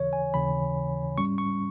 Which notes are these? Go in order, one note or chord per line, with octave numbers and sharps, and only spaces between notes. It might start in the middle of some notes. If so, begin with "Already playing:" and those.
Already playing: D#2 C#3 E3 C#5
G#5
D#2 C#3 E3 B5
G#2 G3 C#4 C#6
C#6